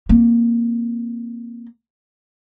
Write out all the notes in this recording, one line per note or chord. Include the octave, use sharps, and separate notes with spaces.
A#3 C4